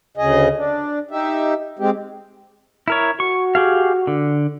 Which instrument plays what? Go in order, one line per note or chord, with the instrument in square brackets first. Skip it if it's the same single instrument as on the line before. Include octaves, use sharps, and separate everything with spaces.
[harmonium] D2 C#3 G#4 D#5
D4
D#4 G4 E5
G#3 C4 G4
[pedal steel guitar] E4 A#4 C#5
[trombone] F#4 [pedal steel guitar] C#6
[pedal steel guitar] G4 G#4 F5
D3